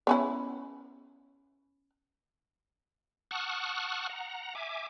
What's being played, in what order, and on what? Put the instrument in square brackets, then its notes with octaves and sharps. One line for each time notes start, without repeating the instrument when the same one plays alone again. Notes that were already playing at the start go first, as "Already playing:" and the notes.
[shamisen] B3 C#4 E4
[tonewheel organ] F#5 A5 C#6 D#6 F6 F#6
F#5 A#5
E5 G#5 D6